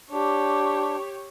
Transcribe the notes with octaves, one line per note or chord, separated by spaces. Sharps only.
D4 G4 C#5